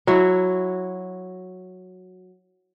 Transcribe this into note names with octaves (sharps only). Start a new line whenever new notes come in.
F#3 E4 F#4